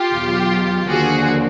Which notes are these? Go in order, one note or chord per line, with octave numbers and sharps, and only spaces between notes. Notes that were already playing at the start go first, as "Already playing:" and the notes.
Already playing: F4 G4
E2 B2 F#3
D#2 D3 F3 A#3 F#4 G#4